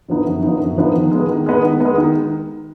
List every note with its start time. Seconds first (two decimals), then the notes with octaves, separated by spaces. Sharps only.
0.08 D3 F3 B3 D#4
0.25 F#2
0.43 D3 F3 B3 D#4
0.60 F#2
0.77 D3 F3 B3 D#4
0.95 D#3
1.11 G#3 B3
1.29 D#3
1.46 G#3 B3
1.64 D#3
1.80 B3
1.85 G#3
1.98 D#3